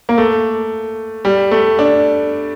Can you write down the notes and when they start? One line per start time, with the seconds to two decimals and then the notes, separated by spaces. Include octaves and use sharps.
0.09 A#3
0.18 A3
1.25 G3
1.51 A3
1.79 D4